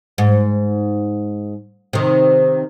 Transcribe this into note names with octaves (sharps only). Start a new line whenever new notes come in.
G#2
C3 D#3